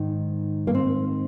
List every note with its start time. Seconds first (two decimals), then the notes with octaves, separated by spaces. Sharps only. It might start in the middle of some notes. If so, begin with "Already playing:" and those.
Already playing: G#2 D#3
0.67 A#3
0.74 C4